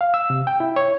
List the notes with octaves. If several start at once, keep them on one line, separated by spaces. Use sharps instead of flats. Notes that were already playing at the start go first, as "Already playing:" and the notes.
F5
E6
C3
G5
E4
C#5